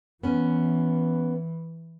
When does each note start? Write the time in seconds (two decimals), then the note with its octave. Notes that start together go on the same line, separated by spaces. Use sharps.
0.23 E3 B3 C#4